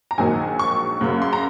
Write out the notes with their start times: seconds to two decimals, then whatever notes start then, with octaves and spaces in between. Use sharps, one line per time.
0.11 A#5
0.18 A#1 G#2 D#3 F#3 A#3 G#5
0.59 C#6
1.01 F#2 C#3 F#3 A#3
1.22 C6
1.33 A#5